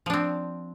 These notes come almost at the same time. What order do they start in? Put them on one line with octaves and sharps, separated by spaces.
F3 D4 C4